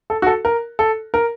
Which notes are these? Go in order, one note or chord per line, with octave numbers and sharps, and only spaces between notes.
A4
F#4
A4
A#4
A4
A#4